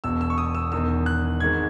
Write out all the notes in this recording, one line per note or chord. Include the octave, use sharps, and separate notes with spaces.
E1 E2 B2 E6
E6
C#6
D#6
E6
E1 E2 D#3 E6
F#6
G#1 G#2 D#3 G#3 G#6